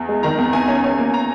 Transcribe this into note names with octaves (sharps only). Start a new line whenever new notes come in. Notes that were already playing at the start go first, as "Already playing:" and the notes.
Already playing: E2
G#3
D#3 A#5
E2
E2 G#5
C#4
C#4 G#5
A#3
A#5